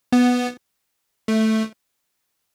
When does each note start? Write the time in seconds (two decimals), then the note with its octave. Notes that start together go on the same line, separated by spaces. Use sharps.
0.12 B3
1.28 A3